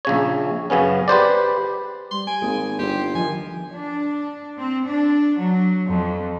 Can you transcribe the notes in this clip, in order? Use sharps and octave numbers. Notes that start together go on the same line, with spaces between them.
A#1 C#3 C#5
F#2 C#3 B3 C#4
G4 B4 C5 D5
G3 C6
G#5 D7
G#1 A#3 G#4
G1 G4 G5 C6
D#3 F3 G#5
D4
C4
D4
F#3
F2